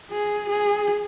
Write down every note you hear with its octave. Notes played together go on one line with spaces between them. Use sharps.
G#4
G#4